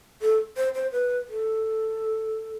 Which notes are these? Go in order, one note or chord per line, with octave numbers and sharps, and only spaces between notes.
A4
C5
C5
B4
A4